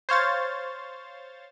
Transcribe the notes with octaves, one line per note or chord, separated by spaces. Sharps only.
C5 C#5 F5 A6